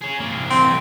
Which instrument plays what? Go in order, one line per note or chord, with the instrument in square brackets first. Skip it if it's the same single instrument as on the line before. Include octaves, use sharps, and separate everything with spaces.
[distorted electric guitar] G#4 C#5
C2 A#3
[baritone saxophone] C4